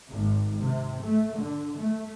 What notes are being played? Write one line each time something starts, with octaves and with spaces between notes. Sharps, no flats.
G#1
C3
A3
D3
A3